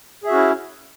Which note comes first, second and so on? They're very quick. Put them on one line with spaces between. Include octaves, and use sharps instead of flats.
G#4 E5 F#4 C#4 E4